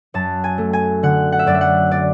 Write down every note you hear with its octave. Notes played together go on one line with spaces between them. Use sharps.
F#2 A5
G#5
A3
G#5
D3 F#5
F#5
E5
F#2 D5
E5
F#5
D5